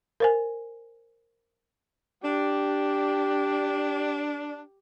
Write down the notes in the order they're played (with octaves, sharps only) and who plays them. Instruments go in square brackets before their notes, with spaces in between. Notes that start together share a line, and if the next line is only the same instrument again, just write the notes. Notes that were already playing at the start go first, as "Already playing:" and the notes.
[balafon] A#4 C5 G#5
[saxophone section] D4 [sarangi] G4